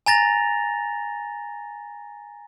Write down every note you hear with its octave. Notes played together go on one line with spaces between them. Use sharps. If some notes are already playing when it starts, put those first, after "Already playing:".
G#5 A#5 A6 A#6 F7